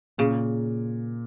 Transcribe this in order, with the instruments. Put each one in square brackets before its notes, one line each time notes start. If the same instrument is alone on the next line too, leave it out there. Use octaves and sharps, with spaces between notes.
[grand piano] A#2 [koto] C#3